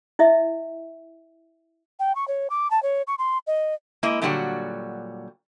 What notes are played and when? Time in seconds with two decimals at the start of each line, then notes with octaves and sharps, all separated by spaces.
0.19 E4 D#5 E5
1.99 G5
2.15 C#6
2.28 C#5
2.50 D6
2.71 A5
2.83 C#5
3.07 C#6
3.19 C6
3.47 D#5
4.03 G#3 A#3 E4 D#5
4.22 A#2 D3 F#3 G3 F#4 G5